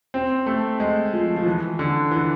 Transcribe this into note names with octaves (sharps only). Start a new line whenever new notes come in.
C4
A3
G#3
F3
F3
E3
D3
E3